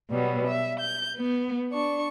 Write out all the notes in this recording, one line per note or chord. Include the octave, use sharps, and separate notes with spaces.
B2 F#3 G3 B3
E5
G6
B3
D4 C#6